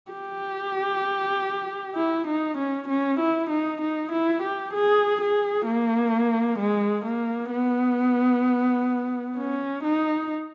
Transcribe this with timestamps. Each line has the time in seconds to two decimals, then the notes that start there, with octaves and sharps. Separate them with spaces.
0.11 G4
1.96 E4
2.27 D#4
2.58 C#4
2.89 C#4
3.19 E4
3.50 D#4
3.82 D#4
4.12 E4
4.43 G4
4.74 G#4
5.21 G#4
5.67 A#3
6.59 G#3
7.05 A#3
7.52 B3
9.37 C#4
9.84 D#4